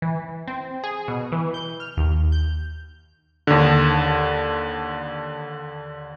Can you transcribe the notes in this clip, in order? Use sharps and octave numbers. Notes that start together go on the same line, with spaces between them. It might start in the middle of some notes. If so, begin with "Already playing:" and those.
E3
C4
G#4
B2
E3
G6
F6
D#2
G6
D#2 D3